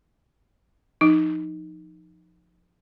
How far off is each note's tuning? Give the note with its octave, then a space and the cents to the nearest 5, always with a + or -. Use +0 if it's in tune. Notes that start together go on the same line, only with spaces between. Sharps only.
F3 +0 D#4 +0